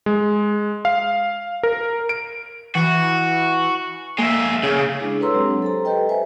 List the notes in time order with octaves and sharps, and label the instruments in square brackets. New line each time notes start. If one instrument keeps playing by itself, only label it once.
[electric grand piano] G#3
F5
A#4
D7
[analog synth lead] E3 [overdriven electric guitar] F#4
[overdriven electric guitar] G#3 E5 [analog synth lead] A#3
[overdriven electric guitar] C#3 [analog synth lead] G#4
[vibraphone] G#3 D4 E4 G#4
A4 B4 C#5 A#5 C6 E6
F#3 G#3 C4 D4 G4
A4 C5 A#5
G4 A4 B4 D#5 G5
B4 C5 E5 G#5